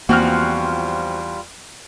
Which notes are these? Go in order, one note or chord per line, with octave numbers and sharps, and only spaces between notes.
E2 F3 G3 A#3 C4 F4 F#4 F6